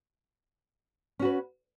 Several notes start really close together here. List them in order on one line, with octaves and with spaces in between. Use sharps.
C#4 F#4 B4